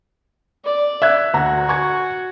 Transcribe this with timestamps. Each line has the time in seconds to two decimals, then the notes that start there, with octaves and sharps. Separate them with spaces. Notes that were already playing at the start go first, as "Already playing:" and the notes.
0.65 D5
1.02 E5 F#6 G#6
1.34 D2 F#4 A#5
1.68 G#5 C#6 G#6